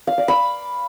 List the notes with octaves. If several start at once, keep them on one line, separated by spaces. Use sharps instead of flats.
F5
D5
B5